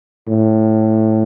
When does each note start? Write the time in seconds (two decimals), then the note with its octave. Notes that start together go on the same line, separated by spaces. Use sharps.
0.28 A2